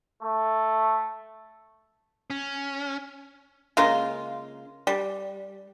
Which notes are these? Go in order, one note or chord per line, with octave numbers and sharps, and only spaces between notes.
A3
C#4
C#3 G#3 A#3 F4
G3